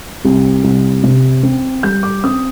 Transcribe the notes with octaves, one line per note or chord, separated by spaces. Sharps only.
C2
C2
C3
C4
G3 G6
D6
C4 D#6